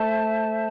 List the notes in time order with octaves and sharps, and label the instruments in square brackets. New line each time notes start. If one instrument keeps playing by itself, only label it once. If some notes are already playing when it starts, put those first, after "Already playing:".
Already playing: [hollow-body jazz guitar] A3 [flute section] C5 E5 A5